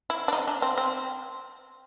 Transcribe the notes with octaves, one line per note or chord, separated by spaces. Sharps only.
E4
D4
D#4
D4
C4
C4